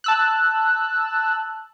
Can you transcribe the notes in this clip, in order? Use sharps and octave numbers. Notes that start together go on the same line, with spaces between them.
A5 E6 F#6